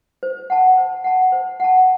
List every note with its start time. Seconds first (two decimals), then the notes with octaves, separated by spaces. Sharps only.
0.23 C5
0.50 F#5 A5
0.78 C5
1.04 F#5 A5
1.32 C5
1.60 F#5 A5